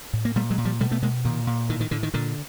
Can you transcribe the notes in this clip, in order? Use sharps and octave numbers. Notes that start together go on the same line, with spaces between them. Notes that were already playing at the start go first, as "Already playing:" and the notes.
A2
A#3
A#2 G3 A3
F#3 G#3
A#2
F3 G3
B2 G3 A3
A3 B3
B2 G#3 A#3
A#2 D#3
A#2
A2 D#3
D#3
A2 D3
D#3
A#2 D3